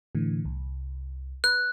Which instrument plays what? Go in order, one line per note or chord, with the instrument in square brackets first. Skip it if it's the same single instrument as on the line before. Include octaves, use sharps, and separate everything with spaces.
[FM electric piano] A2 D3 E3
C2
[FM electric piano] B4 [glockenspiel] F#6